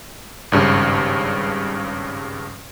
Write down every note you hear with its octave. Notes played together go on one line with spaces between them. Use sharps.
G#1 G2 C#3